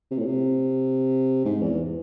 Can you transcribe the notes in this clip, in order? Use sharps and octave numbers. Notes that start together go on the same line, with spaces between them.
C3
A2
C3
G#2
E2